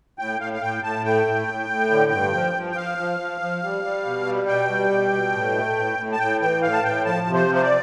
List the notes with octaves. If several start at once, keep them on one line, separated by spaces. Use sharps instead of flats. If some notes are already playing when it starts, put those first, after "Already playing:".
A2 G5
A2 F5
F5
A2 G5
A2 A5
A3 G5
A2
A2
A2
D3
G2
F3
F3
G5
F3 F5
F3
F3
F3
G3
G3
B2
G3
B2 G5
G3
B2
B2
A2
A3
A2
A2
A5
A2 G5
E3 G5
A2 F5
A5
A2 G5
F3 A5
C3
C5
F3
C5
D5